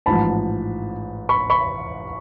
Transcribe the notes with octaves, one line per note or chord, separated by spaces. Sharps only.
A1 G#2 F3 A5 B5
B5 C#6
B5 C#6